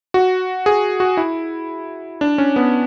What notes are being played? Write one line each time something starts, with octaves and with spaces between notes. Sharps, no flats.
F#4
G#4
F#4
E4
D4
C#4
B3